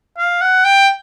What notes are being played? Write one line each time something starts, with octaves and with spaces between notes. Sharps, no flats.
F5
F#5
G5